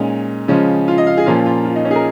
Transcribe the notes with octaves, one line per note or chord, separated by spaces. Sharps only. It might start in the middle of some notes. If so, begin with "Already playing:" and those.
Already playing: A#2 G#3 C#4 D#4
C#3 F3 G#3 C#4
F4
D#5
F5
G#4
A#2 F3 A#3 C#4 F4
F4
F4
D#4
C#4
G#4
A#4